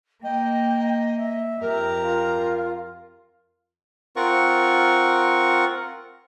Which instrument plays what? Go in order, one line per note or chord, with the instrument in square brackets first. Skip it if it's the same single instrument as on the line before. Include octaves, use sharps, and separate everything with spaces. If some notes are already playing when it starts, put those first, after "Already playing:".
[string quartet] A#3 [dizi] D#5 [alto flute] G5
[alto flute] E5
[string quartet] F2 G4 A#5 [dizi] A#4
[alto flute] F4
[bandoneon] C4 F4 A#4 F#5 C#6